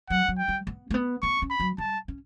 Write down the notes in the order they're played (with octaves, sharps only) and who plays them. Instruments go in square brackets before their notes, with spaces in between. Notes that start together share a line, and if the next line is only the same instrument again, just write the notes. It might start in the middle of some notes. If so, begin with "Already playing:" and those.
[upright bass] F#3 [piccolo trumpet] F#5
[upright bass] F#3
[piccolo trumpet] G5
[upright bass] G3
B3
A3
B3
[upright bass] B3 [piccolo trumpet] C#6
[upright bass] C#4
[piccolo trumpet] B5
[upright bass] F#3
[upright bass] G3 [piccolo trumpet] A5
[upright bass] C#4